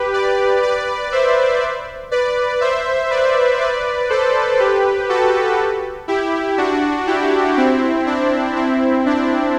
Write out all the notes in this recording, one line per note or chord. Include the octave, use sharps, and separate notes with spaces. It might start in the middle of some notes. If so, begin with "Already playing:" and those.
Already playing: G4 B4
B4 D5
B4 D5
C5 E5
B4 D5
C5 E5
B4 D5
B4 D5
A4 C5
G4 B4
F#4 A4
E4 G4
D4 F#4
E4 G4
C4 E4
D4
C4 E4
D4